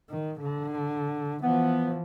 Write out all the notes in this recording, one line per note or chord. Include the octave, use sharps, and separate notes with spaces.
D#3
D3
E3 F3 B3